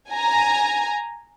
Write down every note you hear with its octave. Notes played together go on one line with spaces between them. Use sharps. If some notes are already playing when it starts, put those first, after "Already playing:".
G#5 A#5